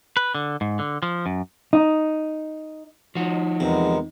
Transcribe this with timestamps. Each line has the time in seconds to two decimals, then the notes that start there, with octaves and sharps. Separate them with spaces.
0.17 B4
0.35 D3
0.61 G#2
0.79 D3
1.03 F3
1.26 F#2
1.73 D#4
3.15 F3 D#4 F#4
3.60 E2 C3 G#3 B3 A#4